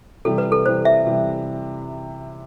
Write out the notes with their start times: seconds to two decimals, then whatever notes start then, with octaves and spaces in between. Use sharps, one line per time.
0.25 C3 E3 G3 A4
0.38 B4
0.52 A4
0.66 C3 E3 G3 C5
0.85 E5
1.07 C3 E3 G3